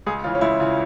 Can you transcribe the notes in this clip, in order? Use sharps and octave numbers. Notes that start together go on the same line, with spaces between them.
C#2 G#4
C#3 E3 F4
C#4
C#2 E4
C#3 E3 F4